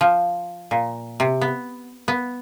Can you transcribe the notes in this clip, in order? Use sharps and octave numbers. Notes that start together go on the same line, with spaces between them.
F3
A#2
C3
B3
B3